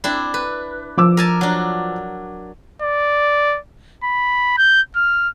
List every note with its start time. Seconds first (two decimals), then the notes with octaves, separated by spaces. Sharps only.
0.04 C4 D4 E4
0.34 B4
0.97 F3 D6 E6
1.17 A#4 G#5 A5
1.41 F#3 D4
2.82 D5
4.04 B5
4.58 G6
4.96 F6